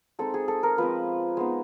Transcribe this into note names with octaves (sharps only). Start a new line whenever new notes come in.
G#3 C4 D#4 A4
G#4
A4
A#4
F3 G#3 C4 B4
G#3 B3 D#4